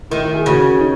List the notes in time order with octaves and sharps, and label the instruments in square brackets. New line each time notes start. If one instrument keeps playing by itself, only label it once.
[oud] D#3 [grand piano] E4
[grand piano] E4
G#4
[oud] C#3 [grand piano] F#4
[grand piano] D#4